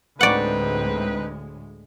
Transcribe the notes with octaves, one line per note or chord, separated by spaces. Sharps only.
D2 A2 G#3 C4 D#4 B4 D5 F#5